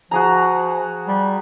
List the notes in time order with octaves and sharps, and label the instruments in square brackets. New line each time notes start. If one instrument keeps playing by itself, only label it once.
[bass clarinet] F3 [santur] F#4 G#4 A#5
[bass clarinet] G3